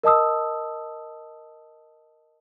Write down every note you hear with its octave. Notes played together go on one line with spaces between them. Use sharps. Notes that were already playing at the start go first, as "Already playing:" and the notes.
A#4 D#5 A5 D#6 E6